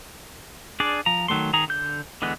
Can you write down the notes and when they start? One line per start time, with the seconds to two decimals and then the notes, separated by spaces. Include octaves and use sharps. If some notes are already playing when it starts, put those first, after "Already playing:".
0.80 D4 G#4 D5
1.06 F3 A#5
1.28 D#3 F#3 A3 C6
1.53 D#3 G#4 A#5
1.68 D3 G6
2.22 D3 E3 G#3 B3